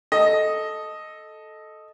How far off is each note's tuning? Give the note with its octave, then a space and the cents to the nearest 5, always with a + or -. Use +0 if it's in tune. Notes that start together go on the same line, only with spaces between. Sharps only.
A4 -10 D#5 +0